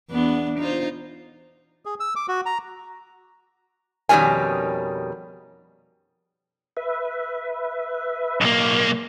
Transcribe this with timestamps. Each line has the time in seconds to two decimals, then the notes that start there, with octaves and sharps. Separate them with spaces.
0.11 E2 B3 D4
0.59 D#4 F4 C5
1.85 G#4
2.00 E6
2.16 D6
2.28 F#4
2.46 A#5
4.09 F2 B2 D#3 G3 C#4 G#5
6.77 B4 E5
8.41 B1 A#3